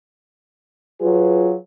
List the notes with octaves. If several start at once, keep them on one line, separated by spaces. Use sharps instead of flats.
F#3 F4 G#4 B4